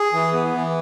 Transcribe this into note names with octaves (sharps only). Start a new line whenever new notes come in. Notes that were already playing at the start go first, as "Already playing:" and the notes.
Already playing: G#4
E3
B3
E3